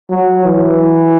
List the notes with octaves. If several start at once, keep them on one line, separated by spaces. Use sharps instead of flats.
F#3
E3